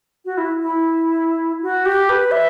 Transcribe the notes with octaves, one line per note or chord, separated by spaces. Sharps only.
F#4
E4
E4
F#4
G4
B4
E5